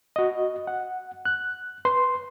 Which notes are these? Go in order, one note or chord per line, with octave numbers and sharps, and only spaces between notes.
F#4 D#5
F#5
F#6
B4 C6